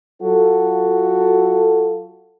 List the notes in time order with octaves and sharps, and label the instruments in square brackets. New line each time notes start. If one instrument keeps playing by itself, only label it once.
[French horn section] F#3 F4 F#4 A4